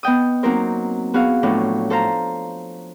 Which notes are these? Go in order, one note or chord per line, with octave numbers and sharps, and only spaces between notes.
B3 D#5 G5 D#6
F#3 A#3 C4 D#4 A#4 C5
B3 F#4 G#4 F5
A2 F3 F#3 D4 E4 F4
A4 C5 F5 A#5